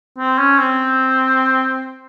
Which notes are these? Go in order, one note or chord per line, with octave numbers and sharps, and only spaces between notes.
C4
C#4
C4